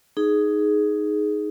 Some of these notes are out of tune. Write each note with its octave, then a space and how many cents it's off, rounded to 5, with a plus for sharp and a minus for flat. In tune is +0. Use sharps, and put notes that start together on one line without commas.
D#4 +0 G#4 +10